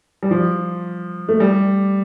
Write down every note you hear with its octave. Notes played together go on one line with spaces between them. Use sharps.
G3
F3
A3
G3